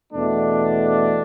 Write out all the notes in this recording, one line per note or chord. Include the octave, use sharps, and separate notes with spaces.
E2 B2 A3 D4